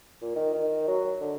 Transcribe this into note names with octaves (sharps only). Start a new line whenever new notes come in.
A#2
D#3
D#3
F#3
D3